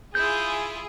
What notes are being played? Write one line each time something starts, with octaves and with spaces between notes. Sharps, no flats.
E4 F4 G#4 G6